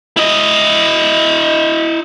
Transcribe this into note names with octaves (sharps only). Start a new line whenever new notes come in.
E4 D#5